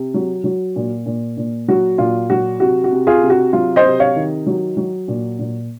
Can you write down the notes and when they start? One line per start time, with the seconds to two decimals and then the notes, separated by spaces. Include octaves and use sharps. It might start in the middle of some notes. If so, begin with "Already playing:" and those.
Already playing: C3
0.14 F#3
0.44 F#3
0.76 A#2
1.06 A#2
1.37 A#2
1.68 F#3 F#4
1.98 A#2 F4
2.30 F#3 F#4
2.60 C3 F#4
2.84 F#4
2.91 C3
3.07 F4 G#4
3.22 C3
3.30 F#4
3.53 F#3 F4
3.76 C5 D#5
3.84 C3
4.00 C#5 F5
4.15 D#3
4.46 F#3
4.77 F#3
5.08 A#2
5.39 A#2